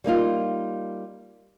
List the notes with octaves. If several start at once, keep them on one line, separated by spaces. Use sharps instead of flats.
G3 A#3 D#4 F4